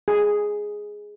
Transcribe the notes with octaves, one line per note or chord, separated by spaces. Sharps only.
G#4